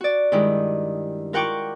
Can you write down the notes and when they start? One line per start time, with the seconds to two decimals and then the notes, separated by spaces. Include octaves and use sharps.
0.01 F#4 D5
0.32 G2 D#3 G#3 E4 G4
1.33 F4 A#4 F#5 G5 C#6 D6